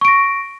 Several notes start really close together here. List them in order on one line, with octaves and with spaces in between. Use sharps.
C#6 D7 A#6